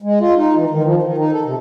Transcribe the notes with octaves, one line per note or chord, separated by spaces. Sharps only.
G#3
F4
D#4
E3
D#3
F3
D#3
D#4
A4
C3